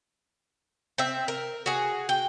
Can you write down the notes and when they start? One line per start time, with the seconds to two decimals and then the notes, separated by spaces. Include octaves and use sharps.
0.98 C4 E5
1.28 A#4
1.66 F#4 G#4
2.09 G5